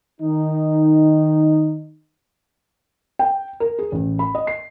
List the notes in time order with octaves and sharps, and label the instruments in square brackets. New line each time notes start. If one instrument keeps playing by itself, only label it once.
[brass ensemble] D#3 D#4
[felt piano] G5
A#4
G#4
A1
B5
D#5
C7